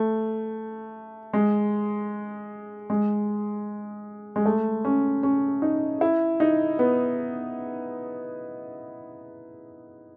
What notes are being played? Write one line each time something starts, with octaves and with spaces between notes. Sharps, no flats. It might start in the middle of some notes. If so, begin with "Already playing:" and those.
Already playing: A3
G#3
G#3
G#3
A3
C#4
C#4
D#4
E4
D#4
B3